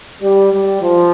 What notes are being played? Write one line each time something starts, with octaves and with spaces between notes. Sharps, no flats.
G3
G3
F3